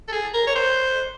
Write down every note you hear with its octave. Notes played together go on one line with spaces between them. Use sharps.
A4
G#4
A#4
C#5
C5